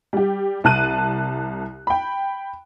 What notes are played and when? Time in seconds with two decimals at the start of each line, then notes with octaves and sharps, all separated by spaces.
0.13 G3 G4
0.64 C2 A5 F#6 D#7
1.87 G5 B5